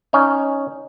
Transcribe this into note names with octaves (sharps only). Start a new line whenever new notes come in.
C#4 D#4